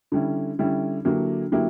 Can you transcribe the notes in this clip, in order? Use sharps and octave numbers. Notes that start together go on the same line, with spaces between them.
D3 G3 C#4 E4
D3 G3 C#4 E4
D3 F#3 A#3 E4 G4
D3 F#3 A#3 E4 G4